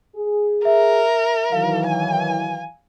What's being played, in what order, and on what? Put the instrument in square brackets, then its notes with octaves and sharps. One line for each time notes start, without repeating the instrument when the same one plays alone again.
[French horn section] G#4
[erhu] A#4 [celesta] E5
[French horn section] D#3 E3 F#3 [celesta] F5
[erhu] G#5